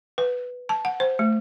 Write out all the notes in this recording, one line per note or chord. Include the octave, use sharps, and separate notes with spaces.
B4
A5
F#5
C5
A3